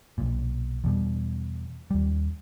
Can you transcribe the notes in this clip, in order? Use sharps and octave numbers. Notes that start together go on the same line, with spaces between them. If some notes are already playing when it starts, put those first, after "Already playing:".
B1 A#2
E2 B2 G3
D#2 G3